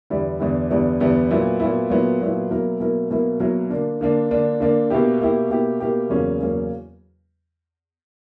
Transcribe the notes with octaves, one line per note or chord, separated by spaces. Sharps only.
E2 D3 G3 B3 E4
E2 D3 G3 B3 E4
E2 D3 G3 B3 E4
E2 D3 G3 B3 E4
A#2 F#3 B3 E4
A#2 F#3 B3 E4
A#2 F#3 B3 E4
A#2 F#3 B3 E4
B2 F#3 A#3 E4 A#4
B2 F#3 A#3 E4 A#4
B2 F#3 A#3 E4 A#4
B2 F#3 A#3 E4 A#4
D3 A#3 D4
D3 A#3 D4
D3 A#3 D4
D3 A#3 D4
B2 A#3 E4 G4
B2 A#3 E4 G4
B2 A#3 E4 G4
B2 A#3 E4 G4
E2 C#3 F#3 A#3 C#4
E2 C#3 F#3 A#3 C#4